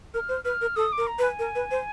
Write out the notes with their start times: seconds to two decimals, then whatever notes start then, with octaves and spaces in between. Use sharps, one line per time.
0.14 A#4 F6
0.29 C5
0.44 B4 F6
0.61 A#4
0.76 A4 D#6
0.92 D6
0.98 A#4
1.07 A#5
1.19 B4
1.23 G#5
1.39 A#4
1.55 B4
1.71 C5